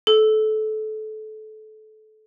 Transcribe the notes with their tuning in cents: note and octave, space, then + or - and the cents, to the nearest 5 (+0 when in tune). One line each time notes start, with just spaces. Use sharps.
A4 -25